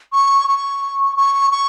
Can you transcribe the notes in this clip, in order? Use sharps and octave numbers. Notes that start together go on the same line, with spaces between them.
C#6
C#6
C#6
C#6